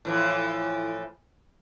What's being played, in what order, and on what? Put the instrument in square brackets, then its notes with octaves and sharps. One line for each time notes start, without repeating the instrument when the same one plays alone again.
[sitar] A2 E3 F3